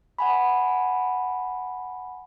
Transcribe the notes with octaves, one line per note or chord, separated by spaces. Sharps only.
F#5 G#5 B5